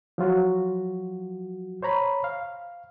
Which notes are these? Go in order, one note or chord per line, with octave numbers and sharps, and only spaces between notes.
F3 F#3 F4 F#4
C5 C#5 A#5 B5
F5